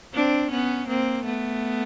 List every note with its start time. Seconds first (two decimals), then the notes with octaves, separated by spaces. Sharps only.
0.14 C4 D4
0.51 B3 C#4
0.88 A#3 C4
1.25 A3 B3